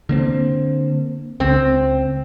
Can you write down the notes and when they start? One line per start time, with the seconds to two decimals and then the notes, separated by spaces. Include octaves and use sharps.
0.09 D3 A#3 C4
1.40 C#2 C4